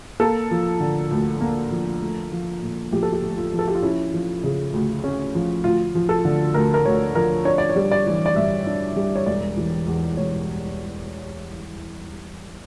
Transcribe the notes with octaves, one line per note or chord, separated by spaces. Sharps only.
A#3 A4
F3
D3
D2
A#3
F3
A3
F3
A#2
A#1 G4
A4
G4
A3
F4
F3
A4
G4
F4
C#4 E4
F3
C#3
D2
C#4
F3
D2 F4
F3
A4
D3
D2 A#4
A#4
D2 C#5
F3 A#4
D4 C#5
D5
C#5
G3
D5
E3
D5
G2 E5
D4
G3
C#5
E1 D5
E3
E2
E1 C#5